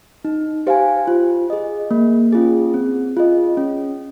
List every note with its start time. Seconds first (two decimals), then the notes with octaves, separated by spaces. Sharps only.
0.25 D#4
0.67 G4 C5 F5 G#5
1.07 F4
1.50 G#4 D#5
1.91 A#3
2.33 C#4 F4 G#4
2.74 C4
3.17 F4 G#4 D#5
3.57 C#4